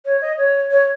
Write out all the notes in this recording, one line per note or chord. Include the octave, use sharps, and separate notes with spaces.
C#5
D#5
C#5
C#5